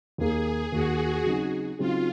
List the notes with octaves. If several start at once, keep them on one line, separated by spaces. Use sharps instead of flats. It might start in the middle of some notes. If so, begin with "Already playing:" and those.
D#2 D#3 A#3 G#4
D#2 D#3 A#3 F#4
C#3 F#3 C4 D#4 G#4
C#3 F#3 C4 D#4 F4 G#4